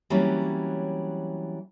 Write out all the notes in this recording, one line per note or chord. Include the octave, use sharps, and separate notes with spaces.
E3 F#3 G3 A#3 C4 C#4